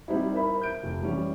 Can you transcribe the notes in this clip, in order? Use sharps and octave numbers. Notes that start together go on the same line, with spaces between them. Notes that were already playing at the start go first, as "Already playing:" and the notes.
G3 C4 D#4 E4
A#4 C5 E5 B5
G6 D7
F1
E3 G3 C#4